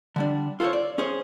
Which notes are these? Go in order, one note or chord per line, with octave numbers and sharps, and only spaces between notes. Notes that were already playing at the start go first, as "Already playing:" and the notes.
D3 G3 D4
F4 A4 A#4 C5 C#5
D5
C#4 G#4 C5 C#5